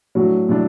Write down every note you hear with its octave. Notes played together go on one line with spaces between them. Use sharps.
A2 F#3 D4 F#4
A2 F#3 D4